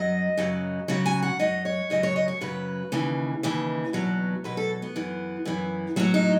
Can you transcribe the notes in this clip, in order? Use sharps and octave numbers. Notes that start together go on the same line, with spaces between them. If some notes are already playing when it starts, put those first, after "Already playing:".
Already playing: F#2 F#3 D#5
F#2 C#3 F#3
F#2 C#3 F#3
G#5
F#5
F#2 C#3 F#3 D#5
C#5
F#2 C#3 F#3 D#5
C#5
D#5
C#5
F#2 C#3 F#3 B4
D#2 C#3 E3
D#2 C#3 E3
E2 B2 F#3
E2 B2 F#3 B4
A4
B3
F#2 E3
F#2 E3
A2 F#3 C#4
D#4